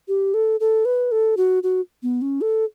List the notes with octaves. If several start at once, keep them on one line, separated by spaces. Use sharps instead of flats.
G4
A4
A4
B4
A4
F#4
F#4
B3
C#4
A4